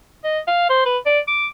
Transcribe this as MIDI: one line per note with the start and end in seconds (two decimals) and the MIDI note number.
0.24 0.39 75
0.47 0.67 77
0.70 0.81 72
0.85 0.98 71
1.06 1.19 74
1.28 1.46 86